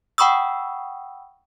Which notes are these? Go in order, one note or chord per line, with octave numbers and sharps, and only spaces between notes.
F#5 G5 B5 C#6 D#6 E6